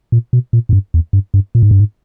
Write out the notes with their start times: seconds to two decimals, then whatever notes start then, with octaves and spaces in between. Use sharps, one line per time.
0.12 A#2
0.33 B2
0.53 A#2
0.69 G#2
0.73 G2
0.94 E2
1.13 G2
1.34 G2
1.55 A#2
1.63 G#2
1.71 G2
1.79 G#2